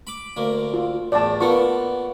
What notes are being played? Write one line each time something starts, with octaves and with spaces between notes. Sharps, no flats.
B5 D6
D2 A#3
F4
E2 A2 D5 A5
A#3 B3 F4 C#6